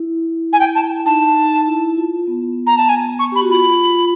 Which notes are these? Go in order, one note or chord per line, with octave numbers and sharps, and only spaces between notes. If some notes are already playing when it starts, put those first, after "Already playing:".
Already playing: E4
G#5
G5
A5
D#4 A5
E4
F4
B3
A#5
A5
G#5
C#6
G4 B5
F#4
F4 B5